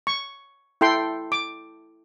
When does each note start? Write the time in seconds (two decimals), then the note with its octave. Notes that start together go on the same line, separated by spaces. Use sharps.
0.07 C#6
0.81 E4 A4 G5 C6
1.32 D6